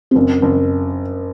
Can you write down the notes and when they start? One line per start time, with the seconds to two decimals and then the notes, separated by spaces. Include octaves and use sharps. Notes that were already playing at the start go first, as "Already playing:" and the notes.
0.11 C4
0.15 F#1 C#4
0.42 F#1